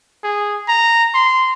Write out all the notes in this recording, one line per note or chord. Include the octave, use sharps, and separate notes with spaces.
G#4
A#5
C6